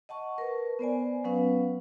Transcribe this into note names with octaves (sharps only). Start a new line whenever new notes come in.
D#5 F#5 A5 C#6
A#4 B4
B3 C5 D5 G#5
F#3 B3 C#4 B4 F5